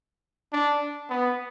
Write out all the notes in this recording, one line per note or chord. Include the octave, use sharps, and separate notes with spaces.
D4
B3